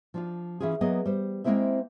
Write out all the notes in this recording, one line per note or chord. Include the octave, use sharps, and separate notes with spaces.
F3 D4 F4
E3 C#4 E4 F4 G#4
F#3 A#3 B3 G#4 D#5
G3 C5
G#3 A#3 C4 E4 C5 E5